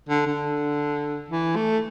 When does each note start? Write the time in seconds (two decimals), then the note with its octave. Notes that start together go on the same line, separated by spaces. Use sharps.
0.09 D3
0.27 D3
1.30 E3
1.56 A3